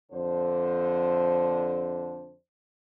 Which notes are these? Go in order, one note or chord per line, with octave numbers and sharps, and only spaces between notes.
F2 D3 D4 C5